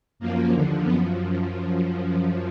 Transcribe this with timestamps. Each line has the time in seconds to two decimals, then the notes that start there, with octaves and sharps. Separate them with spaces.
0.19 F#2 F3 A#3
0.51 D#2 D3 F3
0.83 F#2 F3 B3